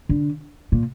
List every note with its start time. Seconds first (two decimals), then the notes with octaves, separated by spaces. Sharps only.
0.09 D3
0.72 A#2